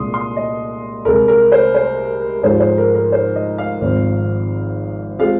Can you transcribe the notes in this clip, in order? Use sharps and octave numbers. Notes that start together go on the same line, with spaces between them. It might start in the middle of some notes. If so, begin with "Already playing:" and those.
Already playing: C2 A#2 G#3 C6 D#6
C6
D#5
C2 C3 G#3 A#4
A#4
C5
C5
G#2 F3 G#3 F4 C5
C5
A#4
A#4
C5
D#5
F5
G#1 G#2 F3 C4
G#3 C4 F4 F5